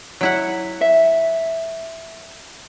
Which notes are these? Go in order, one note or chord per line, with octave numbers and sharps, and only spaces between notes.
F#3 E4 F#5
E5